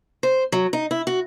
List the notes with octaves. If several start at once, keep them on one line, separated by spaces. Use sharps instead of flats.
C5
F#3
D#4
E4
F#4